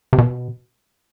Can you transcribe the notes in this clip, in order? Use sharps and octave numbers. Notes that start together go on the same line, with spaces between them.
C3
B2